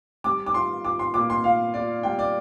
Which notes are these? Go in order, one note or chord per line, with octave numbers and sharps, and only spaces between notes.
G3 D6
D6
F4 C6
F4 D6
C6
A#2 D6
C6
F4 F5
F4 D5
G3 G5
D5